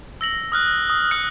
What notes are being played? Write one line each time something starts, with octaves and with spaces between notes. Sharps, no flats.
E6 A#6 F#7
D#6 F6 F#6
D#6
D#6 F6 F#6 C#7